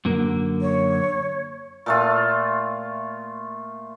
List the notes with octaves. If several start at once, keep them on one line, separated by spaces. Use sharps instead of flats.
F#2 D3 A#3
C#5
A#2 A3 F4